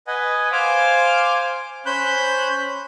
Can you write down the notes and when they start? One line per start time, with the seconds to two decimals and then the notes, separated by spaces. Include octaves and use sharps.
0.07 B4 D#5 F#5 G#5
0.52 C5 F5 G#5 D6
1.86 C#4 C5 B5 F#6 G6